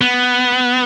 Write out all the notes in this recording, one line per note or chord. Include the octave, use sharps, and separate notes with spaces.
B3